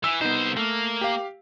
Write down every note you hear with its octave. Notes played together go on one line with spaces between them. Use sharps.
E3 E6
C2 B3 D#4 C5
A3 A#3
G4 F5